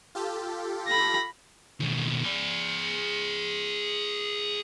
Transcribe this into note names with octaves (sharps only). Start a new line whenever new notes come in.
F4 G4 A4
B5 A#6
D#2 B2
G#4 D5